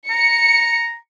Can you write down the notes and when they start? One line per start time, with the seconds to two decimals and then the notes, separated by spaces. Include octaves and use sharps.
0.10 A#5 C#7